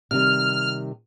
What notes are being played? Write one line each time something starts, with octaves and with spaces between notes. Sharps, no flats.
C3 D#3 G3 F6